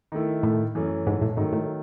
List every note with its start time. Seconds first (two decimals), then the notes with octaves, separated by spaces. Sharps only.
0.12 D#3 A3 E4
0.43 A2
0.75 F#2 E3 A3 C#4
1.06 G#2
1.22 A2
1.37 G#2 D#3 F#3 A3
1.53 A2